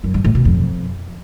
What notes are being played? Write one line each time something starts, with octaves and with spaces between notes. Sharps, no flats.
F#2
G2
A2
B2
F2